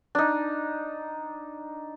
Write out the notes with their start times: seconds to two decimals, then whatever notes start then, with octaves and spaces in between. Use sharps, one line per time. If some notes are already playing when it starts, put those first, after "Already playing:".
0.15 D4 D#4